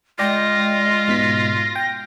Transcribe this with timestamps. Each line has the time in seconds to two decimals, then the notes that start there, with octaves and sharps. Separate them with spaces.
0.19 G#3 F4 D5 G5 A#6
1.08 G#2 B2 B6
1.76 G5